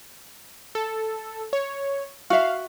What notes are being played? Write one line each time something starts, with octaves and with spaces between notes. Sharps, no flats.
A4
C#5
F#4 E5 F5